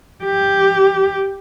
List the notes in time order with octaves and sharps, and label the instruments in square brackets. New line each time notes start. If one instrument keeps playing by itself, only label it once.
[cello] G4